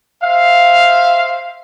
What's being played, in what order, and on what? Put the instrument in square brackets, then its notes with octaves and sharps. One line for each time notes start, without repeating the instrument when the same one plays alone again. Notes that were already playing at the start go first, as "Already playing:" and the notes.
[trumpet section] C5 E5 F5